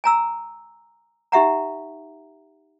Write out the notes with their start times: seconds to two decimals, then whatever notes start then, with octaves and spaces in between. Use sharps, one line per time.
0.04 G#5 A#5 E6
1.32 D#4 G4 E5 F#5 A#5